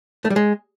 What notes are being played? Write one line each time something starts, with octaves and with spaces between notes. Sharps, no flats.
A3
G3
G#3